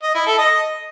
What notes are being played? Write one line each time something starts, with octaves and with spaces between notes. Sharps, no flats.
D#5
E4
A4
D#5